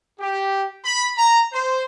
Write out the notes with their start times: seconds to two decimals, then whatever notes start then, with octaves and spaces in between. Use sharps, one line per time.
0.20 G4
0.85 B5
1.17 A#5
1.53 C5